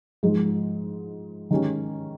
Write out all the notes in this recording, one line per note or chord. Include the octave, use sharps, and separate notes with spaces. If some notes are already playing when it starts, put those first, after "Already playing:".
G#2 F3 G#3
D#3 G#3 C#4 G4